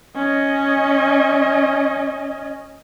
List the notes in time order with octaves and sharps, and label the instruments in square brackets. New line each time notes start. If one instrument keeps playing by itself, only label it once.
[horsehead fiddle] C#4 D#5